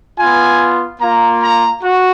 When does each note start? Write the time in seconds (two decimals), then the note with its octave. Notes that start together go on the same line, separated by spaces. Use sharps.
0.18 B3 F4 G#5
1.01 A#3 F4 A#5
1.43 A#5
1.83 F#4